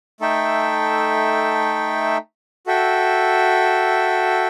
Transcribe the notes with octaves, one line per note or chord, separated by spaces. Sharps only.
A3 D#4 A4 E5 G5
F#4 A4 E5 G5